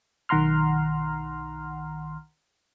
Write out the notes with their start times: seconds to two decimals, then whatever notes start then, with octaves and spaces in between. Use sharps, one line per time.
0.29 B1 D#3 F#5 A#5 C6 F6